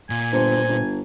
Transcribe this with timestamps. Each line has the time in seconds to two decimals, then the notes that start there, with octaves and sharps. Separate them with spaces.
0.10 A#2 G#5
0.32 G1 C5
0.69 G1